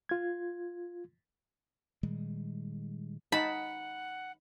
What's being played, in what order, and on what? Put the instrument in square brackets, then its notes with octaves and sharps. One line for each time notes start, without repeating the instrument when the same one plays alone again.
[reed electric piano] F4 G#6
[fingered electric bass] A#2 D#3 G3 G#3
[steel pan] D#4 A5 [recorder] F#5 [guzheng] B5